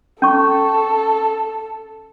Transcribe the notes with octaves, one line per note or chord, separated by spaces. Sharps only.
C#4 A4 C#6